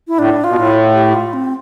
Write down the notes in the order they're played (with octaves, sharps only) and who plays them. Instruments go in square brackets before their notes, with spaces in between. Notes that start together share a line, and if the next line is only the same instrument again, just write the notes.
[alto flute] E4
[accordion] A2 [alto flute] D4
[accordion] B2 [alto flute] F4
[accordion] A2
[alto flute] A4
G4
F4
C4